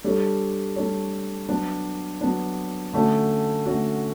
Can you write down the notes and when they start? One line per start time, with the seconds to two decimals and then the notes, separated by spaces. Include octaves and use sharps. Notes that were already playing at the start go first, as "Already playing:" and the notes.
0.04 G3 D4 A4 C#5
0.76 G3 D4 A4 C#5
1.49 F#3 B3 D4
2.21 F#3 B3 D4
2.93 D3 A3 C#4 F#4
3.66 D3 A3 C#4 F#4